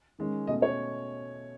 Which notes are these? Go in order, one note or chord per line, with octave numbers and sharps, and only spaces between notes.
D#3 G#3 C#4
B2 A3 C#4 D#5
C#5